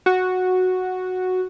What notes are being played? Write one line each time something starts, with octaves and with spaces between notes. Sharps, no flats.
F#4